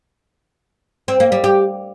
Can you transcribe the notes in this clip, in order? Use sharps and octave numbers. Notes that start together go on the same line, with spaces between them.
C4
A#3
G3
G4